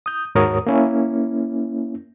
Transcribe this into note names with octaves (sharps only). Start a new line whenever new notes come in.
D#6 G6
D#2 G#2 F#4 A#4 C#5 D#6
A#3 C#4 E4